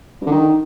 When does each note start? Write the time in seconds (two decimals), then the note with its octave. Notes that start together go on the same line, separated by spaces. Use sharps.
0.21 G2
0.26 D3
0.31 D#3